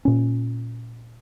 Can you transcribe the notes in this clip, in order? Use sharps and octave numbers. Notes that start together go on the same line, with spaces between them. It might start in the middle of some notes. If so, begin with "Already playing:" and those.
A#2 C#4